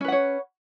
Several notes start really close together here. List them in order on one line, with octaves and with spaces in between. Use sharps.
C#4 B4 F#5 C#5